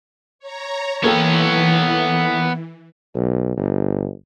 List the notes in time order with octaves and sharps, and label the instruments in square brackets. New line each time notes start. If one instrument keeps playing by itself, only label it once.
[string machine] C#5 A#5
[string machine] E3 [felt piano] A#3 A4 G5 [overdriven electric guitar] B3 C#5
[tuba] B1
G1